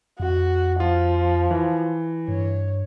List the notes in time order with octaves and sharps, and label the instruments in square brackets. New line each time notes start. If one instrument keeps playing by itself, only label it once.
[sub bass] F2 [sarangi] F#4
[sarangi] F3 [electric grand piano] F4
[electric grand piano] E3
[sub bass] G2 [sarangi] C#5